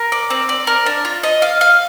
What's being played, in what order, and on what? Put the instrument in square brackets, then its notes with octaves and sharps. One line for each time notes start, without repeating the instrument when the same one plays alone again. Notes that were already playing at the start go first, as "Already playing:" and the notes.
Already playing: [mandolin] A#4
D5
C4
D5
A#4
D4
F4
D#5
F5
F5